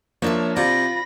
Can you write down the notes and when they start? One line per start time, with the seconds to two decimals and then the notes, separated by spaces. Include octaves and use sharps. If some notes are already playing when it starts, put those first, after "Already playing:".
0.22 F3 A#3 D4 C#5 D#5 E5
0.57 C3 F4 D5 B5 A#6